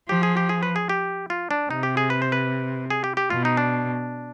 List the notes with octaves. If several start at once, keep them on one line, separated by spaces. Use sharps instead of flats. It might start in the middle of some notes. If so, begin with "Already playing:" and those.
F3 G4
G#4
G4
G#4
B4
G#4
G4
F4
D4
C3 D#4
G4
G#4
B4
C5
B4
G#4
G4
G4
B2 F4
D#4
D4